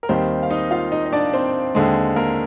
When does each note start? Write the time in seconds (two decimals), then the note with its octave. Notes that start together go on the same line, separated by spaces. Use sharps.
0.03 A#4
0.09 D#2 D#3 G3 C4 C5
0.43 F5
0.50 D#4 D#5
0.71 F4 F5
0.92 D#4 D#5
1.06 D#5
1.12 D4 D5
1.33 C4 C5
1.75 D#2 D3 G#3
2.16 A#3 A#4